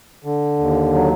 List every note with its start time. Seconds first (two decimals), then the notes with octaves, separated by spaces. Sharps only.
0.24 D3
0.59 D#2
0.93 F#3